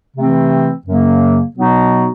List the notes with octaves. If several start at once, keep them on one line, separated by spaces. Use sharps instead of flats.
C3 E3 A3 C4
F#2 C#3 F#3 A#3
B2 F#3 B3 D#4 F#4